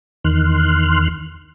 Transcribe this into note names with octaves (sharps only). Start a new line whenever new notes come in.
E2 D#3 C6 F6 F#6